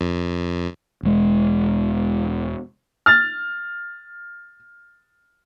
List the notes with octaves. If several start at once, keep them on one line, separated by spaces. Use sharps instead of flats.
F2
E1 G#3
F6 A6